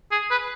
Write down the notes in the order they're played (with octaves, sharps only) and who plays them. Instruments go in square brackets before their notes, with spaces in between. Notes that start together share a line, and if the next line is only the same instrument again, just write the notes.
[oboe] G#4
B4